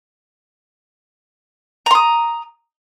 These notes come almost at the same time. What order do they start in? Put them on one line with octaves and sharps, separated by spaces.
A#5 C6 D#6